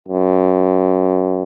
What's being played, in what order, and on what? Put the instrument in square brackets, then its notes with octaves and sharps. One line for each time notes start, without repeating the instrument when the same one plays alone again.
[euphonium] F#2